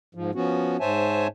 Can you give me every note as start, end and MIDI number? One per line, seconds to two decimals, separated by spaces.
0.15 0.31 44
0.15 0.31 53
0.35 0.77 53
0.35 0.77 59
0.35 0.77 61
0.35 0.77 66
0.80 1.27 44
0.80 1.27 72
0.80 1.27 73
0.80 1.27 76
0.80 1.27 80
0.80 1.27 81